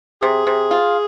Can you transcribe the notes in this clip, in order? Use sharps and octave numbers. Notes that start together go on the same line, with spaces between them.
C3 G#4
C3
F4